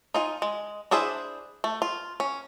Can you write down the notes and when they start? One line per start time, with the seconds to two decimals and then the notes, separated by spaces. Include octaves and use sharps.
0.14 D#4 F4 G#5
0.42 G#3
0.91 D4 E4 G#4 C5 E5
1.64 A3
1.82 F4
2.20 C#4